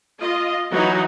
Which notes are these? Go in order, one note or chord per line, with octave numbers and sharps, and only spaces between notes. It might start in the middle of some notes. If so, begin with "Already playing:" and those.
F4 D#5
E3 F#3 D#4 F#4